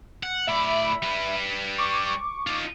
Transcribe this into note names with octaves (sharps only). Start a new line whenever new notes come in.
F#5
A2 D5 E5 B5
G3 B4
C#6 D6
D#4 F4